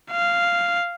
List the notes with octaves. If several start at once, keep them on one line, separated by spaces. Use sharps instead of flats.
F5